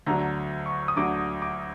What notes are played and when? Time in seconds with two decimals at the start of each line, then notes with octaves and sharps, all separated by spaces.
0.06 D2 D3 F#3 A#5
0.66 C#6
0.88 D#6
0.96 D2 D3 F#3 D6
1.42 D6